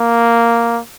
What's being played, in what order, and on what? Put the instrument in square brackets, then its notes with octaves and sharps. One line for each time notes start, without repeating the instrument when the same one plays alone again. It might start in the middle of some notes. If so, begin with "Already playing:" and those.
Already playing: [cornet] A#3